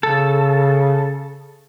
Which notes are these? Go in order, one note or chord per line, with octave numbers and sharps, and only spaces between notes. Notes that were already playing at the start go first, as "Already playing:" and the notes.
C#3 A4